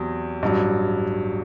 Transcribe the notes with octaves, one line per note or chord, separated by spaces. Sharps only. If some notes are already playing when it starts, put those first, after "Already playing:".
Already playing: E2 C3 F#3
A1 G2 F#3